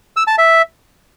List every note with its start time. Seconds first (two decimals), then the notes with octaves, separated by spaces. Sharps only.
0.17 E6
0.27 A5
0.38 E5